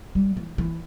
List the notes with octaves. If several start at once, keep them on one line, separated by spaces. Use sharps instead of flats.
G3
E3
E3